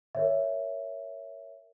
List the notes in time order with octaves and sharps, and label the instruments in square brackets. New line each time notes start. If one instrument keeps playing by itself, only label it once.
[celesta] A#4 C#5 E5